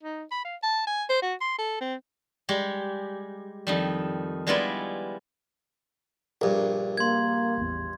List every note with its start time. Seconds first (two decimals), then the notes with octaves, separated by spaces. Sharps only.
0.03 D#4
0.31 B5
0.44 F5
0.63 A5
0.87 G#5
1.10 C5
1.22 F#4
1.41 C6
1.58 A4
1.81 C4
2.49 G3 G#3 G4
3.67 F2 D#3 G3
4.47 G3 G#3 B3 E4 F4 D5
6.41 A#1 G2 A#4
6.97 A#3 C6 G#6
7.57 A1 E2